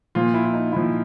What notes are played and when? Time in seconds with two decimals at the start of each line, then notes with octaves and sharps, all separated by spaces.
0.15 A#2 F3 F4
0.34 E4
0.45 E4
0.53 D#4
0.72 A#2 F3 E4